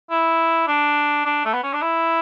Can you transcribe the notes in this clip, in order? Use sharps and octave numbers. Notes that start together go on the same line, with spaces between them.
E4
D4
D4
A3
B3
C#4
D4
E4